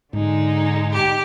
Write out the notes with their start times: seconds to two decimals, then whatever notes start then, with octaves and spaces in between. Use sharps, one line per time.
0.13 G#2 D3 G#3 D#4
0.92 G4